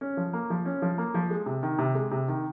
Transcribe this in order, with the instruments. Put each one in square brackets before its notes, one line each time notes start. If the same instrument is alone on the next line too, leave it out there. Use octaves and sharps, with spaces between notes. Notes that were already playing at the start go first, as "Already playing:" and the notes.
[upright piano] C#4
F3
A#3
F3
C#4
F3
A#3
F3
G#3
C3
D#3
C3
G#3
C3
D#3